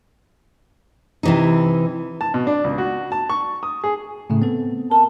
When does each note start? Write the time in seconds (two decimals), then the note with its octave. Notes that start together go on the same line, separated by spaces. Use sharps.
1.23 C3 E3 D#4
2.21 A5
2.34 B2
2.47 D4
2.64 C#2
2.78 F#4
3.12 A5
3.30 C#6
3.63 D#6
3.84 G#4
4.30 A2 C#3 A3
4.42 B3 C4 A4
4.91 A#4 A5